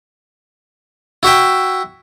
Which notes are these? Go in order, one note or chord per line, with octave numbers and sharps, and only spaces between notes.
E4 F#4 E5 G5